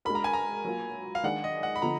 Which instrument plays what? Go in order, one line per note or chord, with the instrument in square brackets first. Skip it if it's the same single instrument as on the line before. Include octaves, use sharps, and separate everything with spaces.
[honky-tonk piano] G#3 D4 F#4 A#4 [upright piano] B5
[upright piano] A#5
G#5
A#5
[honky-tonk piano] F#3 A#3 F4
[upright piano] F5
[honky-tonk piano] D#3 G#3 D4 G#4 D5 [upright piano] F#5
[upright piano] D#5
F#5
B5
[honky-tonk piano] D3 F3 B3 [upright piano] A#5